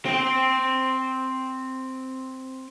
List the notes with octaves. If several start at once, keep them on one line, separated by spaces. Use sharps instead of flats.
C4 G5